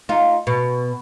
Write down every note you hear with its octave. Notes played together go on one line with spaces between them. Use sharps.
D#4 F4
B2